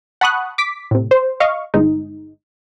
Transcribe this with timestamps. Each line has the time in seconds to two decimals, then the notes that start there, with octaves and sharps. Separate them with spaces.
0.21 F#5 A5 B5 C#6 D#6 F#6
0.58 D6 B6
0.91 A2 C3
1.11 C5
1.40 D#5 F5 C#6
1.74 G1 G#3 D#4